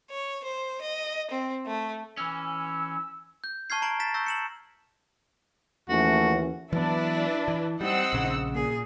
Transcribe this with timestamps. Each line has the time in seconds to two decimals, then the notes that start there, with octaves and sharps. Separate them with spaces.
0.10 C#5
0.44 C5
0.81 D#5
1.31 C4
1.67 A3
2.17 E3 C#4 E6
3.44 G6
3.70 A5 C#6 F6 G#6 C7
3.82 A#5 G#6 D7 F#7
4.00 A6 B6 E7
4.14 C#6 E6 G6 A#6
4.26 C#7 E7 F#7
5.90 D#2 E3 A3 C#4 F#4
6.73 E3 F#3 B3 D4 E4 B4
7.48 E3
7.81 G3 C4 D#4 F#5 E6
8.13 A#1 C#3
8.55 A#2 G#4